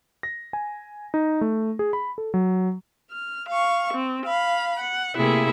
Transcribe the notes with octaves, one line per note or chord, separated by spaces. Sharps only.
A#6
G#5
D#4
A3
G#4
B5
A4
F#3
F6
F5 C#6
C4
F5 B5
F#5
C3 A3 A#3 E4 G#4